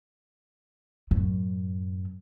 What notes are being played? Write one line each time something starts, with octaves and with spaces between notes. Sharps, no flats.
F#2 A2